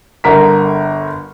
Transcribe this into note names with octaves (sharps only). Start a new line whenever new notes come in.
G1 D3 A#4 B6